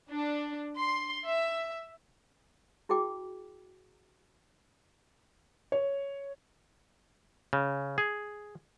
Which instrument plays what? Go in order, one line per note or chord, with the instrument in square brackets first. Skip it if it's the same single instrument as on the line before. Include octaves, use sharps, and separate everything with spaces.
[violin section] D4
C6
E5
[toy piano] E4 F#4 G#4 G5 D6
[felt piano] C#5
[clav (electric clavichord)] C#3
G#4